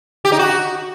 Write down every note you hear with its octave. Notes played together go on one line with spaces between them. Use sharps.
G4
D#4
F#4